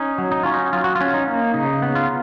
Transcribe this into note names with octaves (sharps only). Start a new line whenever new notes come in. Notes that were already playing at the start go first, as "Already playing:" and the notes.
Already playing: C#4 D#4
F#3
D#4
C#4 F4
D#4
F#3 F4
F#4
F4
C#4
D#4
A#3
C#3 D#4
B3
F4